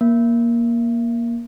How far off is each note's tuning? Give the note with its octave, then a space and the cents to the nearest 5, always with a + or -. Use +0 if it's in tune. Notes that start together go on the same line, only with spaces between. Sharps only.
A#3 +10